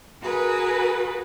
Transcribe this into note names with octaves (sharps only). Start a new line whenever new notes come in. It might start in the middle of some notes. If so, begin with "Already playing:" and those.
F#4 G#4 A#4 B4